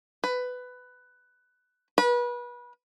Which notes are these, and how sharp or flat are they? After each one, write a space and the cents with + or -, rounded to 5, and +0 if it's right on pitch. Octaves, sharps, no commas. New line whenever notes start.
B4 +15
B4 -30